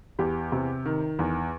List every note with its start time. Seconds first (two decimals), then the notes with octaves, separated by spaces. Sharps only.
0.19 E2 G4
0.52 C3
0.86 D#3
1.19 E2